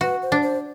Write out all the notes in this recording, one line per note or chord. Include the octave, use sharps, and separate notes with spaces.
F#4 B4
C5
D4
C5